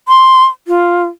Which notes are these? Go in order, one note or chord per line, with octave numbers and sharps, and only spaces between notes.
C6
F4